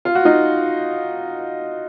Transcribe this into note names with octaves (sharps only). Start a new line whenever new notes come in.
F4
F#4
D#4 F4